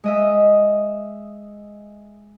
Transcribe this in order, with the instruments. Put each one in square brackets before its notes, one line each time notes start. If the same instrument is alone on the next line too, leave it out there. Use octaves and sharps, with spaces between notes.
[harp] G#3 D#5 E5